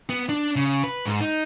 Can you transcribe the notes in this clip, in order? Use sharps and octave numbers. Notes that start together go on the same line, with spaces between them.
B3
D4
C#3
B4
G#2
D#4